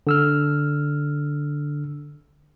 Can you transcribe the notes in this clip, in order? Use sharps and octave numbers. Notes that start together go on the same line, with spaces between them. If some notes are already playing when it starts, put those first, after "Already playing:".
D3 E6 F6